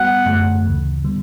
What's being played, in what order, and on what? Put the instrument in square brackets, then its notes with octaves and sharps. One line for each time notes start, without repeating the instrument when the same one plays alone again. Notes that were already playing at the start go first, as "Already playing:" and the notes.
Already playing: [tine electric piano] G3 B3 F#4 [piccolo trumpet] F#5
[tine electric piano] F#2 D3 A3
D2 C#3 E3
D3 G3 B3